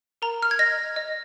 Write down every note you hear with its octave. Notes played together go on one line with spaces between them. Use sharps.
A#4 A#5
F6
G#6
D#5 A#6
D#5